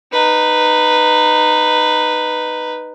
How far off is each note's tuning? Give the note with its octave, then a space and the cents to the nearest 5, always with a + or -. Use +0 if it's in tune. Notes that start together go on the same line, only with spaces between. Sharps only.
D#4 -15 B4 +0